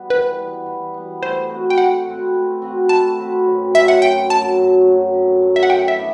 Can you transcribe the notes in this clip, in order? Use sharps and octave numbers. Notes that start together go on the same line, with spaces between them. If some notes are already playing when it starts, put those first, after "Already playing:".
Already playing: G3 B3
E3 B4
G3 B3
E3
G3 B3
A3 C5
C4 F#4 B4
G5
A3 F#5
C4 F#4 B4
A3
C4 F#4 B4
A3 A5
C4 F#4 B4
F#2
F#3 A3 E5
F#5
F#2 G5
F#3 A3 A5
F#2
F#3 A3
F#2
F#3 A3
E5
F#5
E3 G5
E5
B3 D4